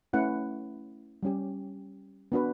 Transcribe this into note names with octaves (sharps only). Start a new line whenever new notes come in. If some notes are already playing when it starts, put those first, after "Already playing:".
A3 C#4 E4 B4 F#5
G3 C#4 G4
B3 D4 F#4 B4